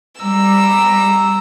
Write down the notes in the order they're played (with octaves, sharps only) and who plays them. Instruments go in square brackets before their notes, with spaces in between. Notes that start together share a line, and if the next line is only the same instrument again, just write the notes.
[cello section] G3 [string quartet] A#5 E6